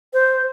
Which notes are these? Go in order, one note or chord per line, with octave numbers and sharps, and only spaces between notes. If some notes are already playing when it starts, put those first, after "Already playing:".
C5